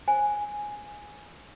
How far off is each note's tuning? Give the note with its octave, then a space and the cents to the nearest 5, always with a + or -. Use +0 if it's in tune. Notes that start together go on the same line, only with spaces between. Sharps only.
C5 +30 G#5 +0